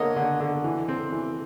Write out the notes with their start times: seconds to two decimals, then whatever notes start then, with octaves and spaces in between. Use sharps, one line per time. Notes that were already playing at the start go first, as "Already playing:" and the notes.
Already playing: D3 A#3 C#5 D#5
0.16 D3
0.40 D3
0.64 E3
0.89 C4
1.12 E3